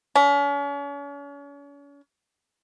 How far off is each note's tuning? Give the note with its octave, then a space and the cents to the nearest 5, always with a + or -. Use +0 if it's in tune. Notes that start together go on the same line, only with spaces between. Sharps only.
C#4 +40